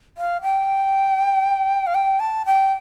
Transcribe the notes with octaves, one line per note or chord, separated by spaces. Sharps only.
F5
G5
F5
G5
A5
G5